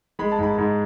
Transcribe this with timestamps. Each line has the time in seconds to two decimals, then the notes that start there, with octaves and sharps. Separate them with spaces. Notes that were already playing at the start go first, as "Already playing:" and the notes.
0.19 G#3 B5
0.32 A5
0.39 G#2 B5
0.58 G#2